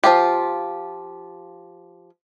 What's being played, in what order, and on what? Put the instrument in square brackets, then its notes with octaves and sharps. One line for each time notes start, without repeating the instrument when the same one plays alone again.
[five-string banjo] F3 F4 G4